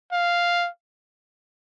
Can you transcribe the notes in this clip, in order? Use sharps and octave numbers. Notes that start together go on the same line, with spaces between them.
F5